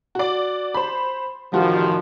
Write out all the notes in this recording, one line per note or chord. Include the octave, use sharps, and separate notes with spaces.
F#4 D5
C5 B5
A1 D#3 F3 G3 F#4